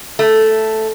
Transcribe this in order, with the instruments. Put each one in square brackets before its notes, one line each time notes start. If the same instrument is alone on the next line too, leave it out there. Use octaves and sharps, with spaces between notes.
[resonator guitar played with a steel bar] A3